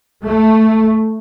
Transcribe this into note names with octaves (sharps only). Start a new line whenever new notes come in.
A3